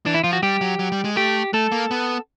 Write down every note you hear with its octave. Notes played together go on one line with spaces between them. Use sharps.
E3 D4
E4
F3 F4
F#4
G3 G4
F#3
F#3
G3
G#3
A3 G4
A3 A4
A#3
B3